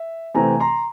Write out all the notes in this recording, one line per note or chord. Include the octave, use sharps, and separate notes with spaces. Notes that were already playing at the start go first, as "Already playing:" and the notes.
Already playing: E5
C3 E3 A3 C4 G#5 A#5
A#5 C6